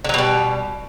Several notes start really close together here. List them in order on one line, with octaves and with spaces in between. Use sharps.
D3 F#3 B2 G3